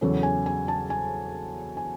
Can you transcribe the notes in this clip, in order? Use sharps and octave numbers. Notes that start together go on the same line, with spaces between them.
E2 C#3 F#3 C#4 A4
G#5
G#5
A5
G#5
G#5